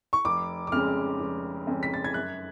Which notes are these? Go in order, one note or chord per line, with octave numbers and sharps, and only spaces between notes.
C#6
F1 D6
D6
F2 C#3 G#3 C#4 F6
F1
F2 C#3 G#3 C#4
B6
A6
G#6
F#2 F#6